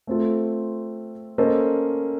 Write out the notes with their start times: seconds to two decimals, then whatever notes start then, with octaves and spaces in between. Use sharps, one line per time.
0.07 A3 C4 F4 A4
1.38 A#3 C#4 A4 C5 D#5